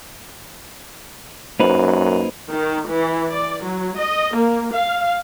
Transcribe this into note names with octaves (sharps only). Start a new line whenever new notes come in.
F#2 A#3 D#4 B4 C5
D#3
E3
D5
F#3
D#5
A#3
F5